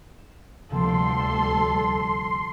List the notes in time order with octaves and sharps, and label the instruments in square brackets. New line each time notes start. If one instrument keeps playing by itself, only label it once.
[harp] E7
[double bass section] D2 G3 [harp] C3 F3 A#3 [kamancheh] A4 [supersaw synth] C6